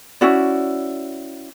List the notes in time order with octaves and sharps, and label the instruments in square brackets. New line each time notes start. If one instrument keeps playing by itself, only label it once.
[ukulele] C#4 E4 F#4 D5